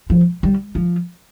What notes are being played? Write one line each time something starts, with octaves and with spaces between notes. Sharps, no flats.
F3
G3
F3